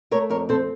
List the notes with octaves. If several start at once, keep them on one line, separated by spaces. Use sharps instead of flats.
A3 A#4 C#5
F2 A#4 C#5
C4 A4 C5